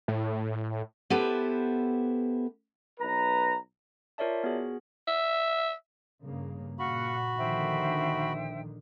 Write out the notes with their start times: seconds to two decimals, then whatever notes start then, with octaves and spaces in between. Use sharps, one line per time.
0.08 A2
1.10 B3 E4 G4 A4 B4 C5
3.00 B1 B4 A#5
4.18 F4 A#4 C#5 D5 E5 A5
4.44 B3 F#4 G#4
5.07 E5
6.22 G2 C#3 A#3
6.79 A#2 F#4 F5 F#5 B5 C#6
7.37 A#1 D3 D#3 C5 E5 G5